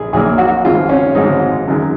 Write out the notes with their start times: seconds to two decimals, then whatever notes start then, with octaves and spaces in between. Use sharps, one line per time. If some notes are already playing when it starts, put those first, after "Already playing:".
Already playing: A#1 G#4
0.13 A#1 A#2 F#3 A#3 G#4
0.38 F#4
0.65 G#1 G#2 F3 G#3 F4
0.89 C#4
1.15 G#1 G#2 F3 G#3 D#4
1.67 F#2 D#3 G#3